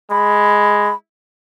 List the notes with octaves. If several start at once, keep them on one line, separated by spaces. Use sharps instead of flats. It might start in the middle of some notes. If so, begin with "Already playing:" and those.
G#3 B5